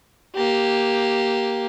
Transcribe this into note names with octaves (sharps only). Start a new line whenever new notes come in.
A#3 G4